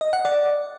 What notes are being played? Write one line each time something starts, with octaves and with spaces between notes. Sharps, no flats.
D#5
F#5
D5